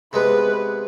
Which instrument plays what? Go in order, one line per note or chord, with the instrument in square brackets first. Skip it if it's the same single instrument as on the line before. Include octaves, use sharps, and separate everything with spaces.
[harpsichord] C3 G#3 B3 [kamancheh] B4